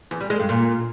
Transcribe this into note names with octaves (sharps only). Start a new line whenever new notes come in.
E2
G3
G#3
G2
A#2